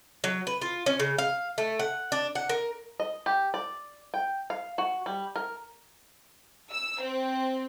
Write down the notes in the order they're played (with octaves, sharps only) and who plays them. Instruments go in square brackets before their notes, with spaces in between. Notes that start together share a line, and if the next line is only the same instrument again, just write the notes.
[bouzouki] F#3
B4
F4
C#4
C#3
F5
A3
F#5
D4
F#5
A#4
[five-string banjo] D#5
G4
D5
G5
F5
F#4
G3
A#4
[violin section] E6
C4